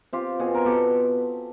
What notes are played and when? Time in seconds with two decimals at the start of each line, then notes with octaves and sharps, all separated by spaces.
0.13 C4 F4 G4
0.39 B2 F#4 G#4
0.55 A#4
0.65 B2 G4 A4